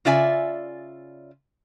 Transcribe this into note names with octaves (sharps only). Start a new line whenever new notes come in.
C#3 F4 D5 E5 G#5